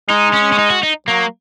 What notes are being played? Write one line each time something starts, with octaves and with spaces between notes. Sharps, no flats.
G#3 D#4
C#4
C#4
D#4
F#4
D#4
F#3 A#3